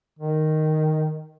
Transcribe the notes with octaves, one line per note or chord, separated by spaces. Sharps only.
D#3